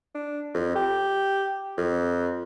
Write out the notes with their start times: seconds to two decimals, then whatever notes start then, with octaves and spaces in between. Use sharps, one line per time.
0.15 D4
0.54 F2
0.76 G4
1.77 F2